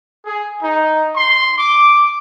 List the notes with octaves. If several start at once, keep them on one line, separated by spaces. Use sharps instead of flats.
G#4
D#4
C6
D6